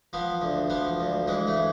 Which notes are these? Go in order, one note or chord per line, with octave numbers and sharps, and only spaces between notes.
F3 B3
D2
F3 B3
D2
E3 G#3
A3
E3